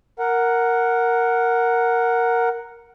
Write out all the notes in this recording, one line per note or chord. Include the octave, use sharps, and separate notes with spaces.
A#4 F#5